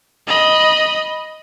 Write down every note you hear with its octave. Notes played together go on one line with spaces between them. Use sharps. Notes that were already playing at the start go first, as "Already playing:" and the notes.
D#5 B5